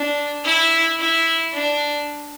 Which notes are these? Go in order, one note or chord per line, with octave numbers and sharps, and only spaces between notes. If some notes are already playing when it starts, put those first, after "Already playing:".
Already playing: D4
E4
E4
D4